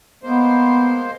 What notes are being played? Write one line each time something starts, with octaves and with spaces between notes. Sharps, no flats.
G#3 A#3 B3 C5